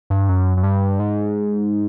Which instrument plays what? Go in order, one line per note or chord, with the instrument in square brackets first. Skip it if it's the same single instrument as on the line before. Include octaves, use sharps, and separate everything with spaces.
[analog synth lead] G2
F#2
F#2
G2
G#2